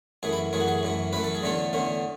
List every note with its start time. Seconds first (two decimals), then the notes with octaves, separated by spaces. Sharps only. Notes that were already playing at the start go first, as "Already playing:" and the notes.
0.23 F#2 E3 A3 G#4
0.33 E4
0.53 F#2 E3 A3 G#4
0.60 F#4
0.68 G#4
0.83 F#2 E3 A3
1.13 F#2 E3 A3 B4
1.24 A4
1.35 G#4
1.43 E2 D3 A3 C#4 A4
1.73 E2 D3 A3 C#4